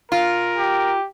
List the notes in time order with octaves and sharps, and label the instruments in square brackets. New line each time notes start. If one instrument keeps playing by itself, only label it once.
[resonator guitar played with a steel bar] F4 [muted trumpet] A#4
[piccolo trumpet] G4